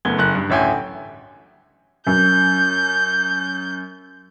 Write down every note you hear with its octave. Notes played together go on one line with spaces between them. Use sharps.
F#1 A3 B3 G#6 G7
F#1 F#6
G2
A1 D2 C#5 E5 G5 G#5
F#2 G6